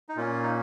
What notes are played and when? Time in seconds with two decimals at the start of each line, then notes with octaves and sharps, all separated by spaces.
0.09 D#4
0.16 A#2 A#3 C#4 F4
0.43 D#4